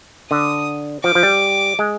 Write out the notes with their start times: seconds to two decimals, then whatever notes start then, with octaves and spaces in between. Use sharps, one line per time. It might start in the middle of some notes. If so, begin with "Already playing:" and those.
0.31 D3 D#6
1.04 F3 D6
1.15 F3
1.23 G3
1.79 G#3